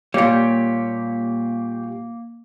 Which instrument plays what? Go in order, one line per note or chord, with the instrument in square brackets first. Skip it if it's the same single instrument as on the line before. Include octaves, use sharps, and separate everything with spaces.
[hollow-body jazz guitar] A#2 G3 [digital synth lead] A#3 [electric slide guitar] G4 C#5